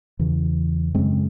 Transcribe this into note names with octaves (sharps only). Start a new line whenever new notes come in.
E2 C#3 E3
F#2 C#3 G#3 C4